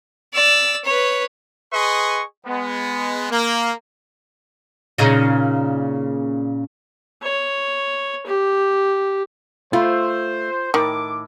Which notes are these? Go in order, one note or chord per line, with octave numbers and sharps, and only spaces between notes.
D5 E6
B4 C#5
G#4 B4 D#5 C6 C#6
G#3 B3
A#3
A#2 C#3 D#4
C#5
G4
A3 F4 C5
A2 D#3 D6